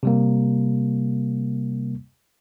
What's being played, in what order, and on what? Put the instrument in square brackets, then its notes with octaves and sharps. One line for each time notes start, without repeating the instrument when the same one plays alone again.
[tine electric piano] C3 G3 A#3